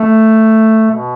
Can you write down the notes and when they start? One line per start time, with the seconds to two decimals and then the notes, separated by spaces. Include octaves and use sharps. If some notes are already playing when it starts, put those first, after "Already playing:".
Already playing: A3
0.91 B2